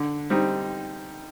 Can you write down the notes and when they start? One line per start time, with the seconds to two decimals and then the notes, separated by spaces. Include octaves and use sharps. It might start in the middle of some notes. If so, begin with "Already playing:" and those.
Already playing: D3
0.30 G3 C4 D#4